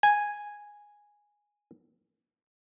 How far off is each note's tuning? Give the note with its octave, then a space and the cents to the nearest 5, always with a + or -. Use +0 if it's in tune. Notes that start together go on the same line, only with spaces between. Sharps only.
G#5 -5